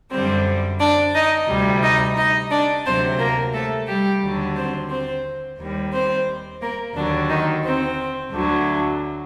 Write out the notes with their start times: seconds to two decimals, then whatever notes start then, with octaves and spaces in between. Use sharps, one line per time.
0.11 F#2 D3 G3 C4 C5
0.79 D4 D5
1.14 D#4 D#5
1.48 D2 C3 G3
1.82 D#4 D#5
2.16 D#4 D#5
2.50 D4 D5
2.85 D2 C3 F#3 C4 C5
3.18 A#3 A#4
3.53 A3 A4
3.87 G3 G4
4.22 D#2 D3 F#3
4.56 C4 C5
4.90 C4 C5
5.58 D#2 D#3 G3
5.92 C4 C5
6.61 A#3 A#4
6.95 D#2 D3 F#3 D4
7.29 D#3 D#4
7.64 C4
8.31 D2 D3 F#3